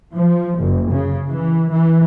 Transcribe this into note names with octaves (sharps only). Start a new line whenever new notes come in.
F3
F#1
C#3
E3
E3